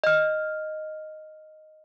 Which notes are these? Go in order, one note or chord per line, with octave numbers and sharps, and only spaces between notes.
D#5 F6